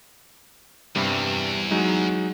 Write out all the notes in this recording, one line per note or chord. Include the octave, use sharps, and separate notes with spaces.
E2 G2 C3 G3
F#3 G#3 D#4